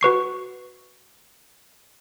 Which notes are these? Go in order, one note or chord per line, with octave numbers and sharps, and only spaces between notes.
F#4 B4 C#6 C7